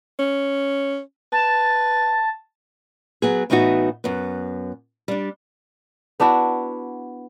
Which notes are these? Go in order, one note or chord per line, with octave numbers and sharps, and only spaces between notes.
C#4
B4 A5
F#3 B3 G#4
A2 E3 B3 D#4 F#4
F#2 B3
G3 D4
B3 D4 E4 F#4